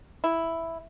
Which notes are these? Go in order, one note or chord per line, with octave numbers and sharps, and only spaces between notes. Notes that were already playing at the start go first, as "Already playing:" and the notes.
E4